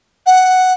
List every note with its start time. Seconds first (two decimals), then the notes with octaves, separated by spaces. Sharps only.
0.26 F#5